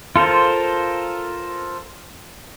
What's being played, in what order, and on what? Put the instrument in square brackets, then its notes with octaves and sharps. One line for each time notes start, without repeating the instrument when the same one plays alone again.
[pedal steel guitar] F4 A4 A#4 C5